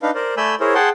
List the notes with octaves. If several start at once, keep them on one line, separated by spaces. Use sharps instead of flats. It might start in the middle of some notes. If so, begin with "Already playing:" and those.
D4 D#4 B4 F5
A#4 C5 D5
A3 D5 G#5 B5 E6 G6
E4 G#4 A#4 C5 C#5
G#4 F#5 G5 A5 C6